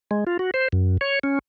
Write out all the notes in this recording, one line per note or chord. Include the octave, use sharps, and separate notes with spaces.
G#3
F4
F#4
C5
F#2
C#5
C#4